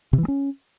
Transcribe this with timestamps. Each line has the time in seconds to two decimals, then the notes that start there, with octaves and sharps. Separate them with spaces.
0.13 C3
0.18 E3
0.23 G#3
0.28 C#4